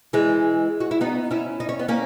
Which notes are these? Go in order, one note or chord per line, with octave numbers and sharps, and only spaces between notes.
E3 G#3
F#4
E4
B3 D#4
C#4 E4
D#4
C#4
B3
A#3 C#4